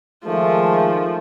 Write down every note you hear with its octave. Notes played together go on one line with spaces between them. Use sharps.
D#3 F3 G#3 A3